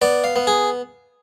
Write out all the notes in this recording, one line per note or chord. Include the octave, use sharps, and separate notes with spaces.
B3 D5
F5
B3
G#4